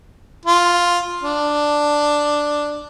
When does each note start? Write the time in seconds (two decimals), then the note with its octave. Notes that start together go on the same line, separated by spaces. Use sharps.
0.45 F4
1.23 D4